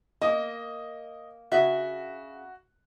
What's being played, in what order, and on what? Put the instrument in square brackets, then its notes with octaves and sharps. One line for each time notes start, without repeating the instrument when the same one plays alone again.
[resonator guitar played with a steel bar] A#3 [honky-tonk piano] D#5
[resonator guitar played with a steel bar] C#3 E5 [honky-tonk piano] F#4